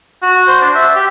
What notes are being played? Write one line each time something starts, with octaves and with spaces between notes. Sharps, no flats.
F#4
C5
D4
E5
G4